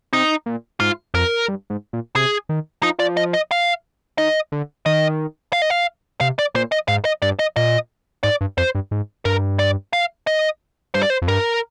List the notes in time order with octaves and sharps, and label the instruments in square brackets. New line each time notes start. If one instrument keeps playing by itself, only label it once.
[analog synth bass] C3 [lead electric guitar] D#4
[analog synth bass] A#2
[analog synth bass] G#2 [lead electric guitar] F4
[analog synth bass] F2 [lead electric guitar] A#4
[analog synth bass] G2
G#2
A#2
[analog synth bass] C3 [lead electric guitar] G#4
[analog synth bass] D#3
[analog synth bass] F3 [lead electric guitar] D#4
[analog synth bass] F3 [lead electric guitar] D5
[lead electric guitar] D#5
D#5
F5
[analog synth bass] D#3 [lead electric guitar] D#5
[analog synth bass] D3
[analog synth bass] D#3 [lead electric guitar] D#5
[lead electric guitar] F5
D#5
F5
[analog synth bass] C3 [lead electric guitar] F5
[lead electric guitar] D5
[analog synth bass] A#2 [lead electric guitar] C5
[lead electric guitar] D#5
[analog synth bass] G#2 [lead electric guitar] F5
[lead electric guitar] D#5
[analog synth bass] G2 [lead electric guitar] D5
[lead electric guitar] D#5
[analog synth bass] A#2 [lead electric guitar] D#5
[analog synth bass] G#2 [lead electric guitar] D5
[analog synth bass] G2
[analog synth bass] F2 [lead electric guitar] C5
[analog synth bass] G2
G#2
[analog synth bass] G2 [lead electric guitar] A#4
[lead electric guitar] D5
F5
D#5
[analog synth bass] G2 [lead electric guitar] C5
[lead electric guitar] D5
C5
[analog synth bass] F2
[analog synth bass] G2 [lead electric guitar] A#4